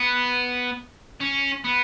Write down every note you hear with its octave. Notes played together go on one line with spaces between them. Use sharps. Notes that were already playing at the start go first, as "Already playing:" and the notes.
Already playing: B3
C#4
B3